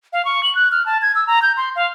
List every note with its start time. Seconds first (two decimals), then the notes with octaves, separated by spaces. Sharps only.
0.13 F5
0.25 C#6
0.43 F#7
0.55 F#6
0.72 F6
0.86 A5
1.02 G#6
1.15 E6
1.27 A#5
1.42 G6
1.57 C6
1.76 F5